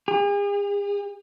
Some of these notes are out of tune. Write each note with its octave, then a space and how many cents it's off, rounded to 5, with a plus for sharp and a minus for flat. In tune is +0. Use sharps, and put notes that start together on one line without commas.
G#4 -45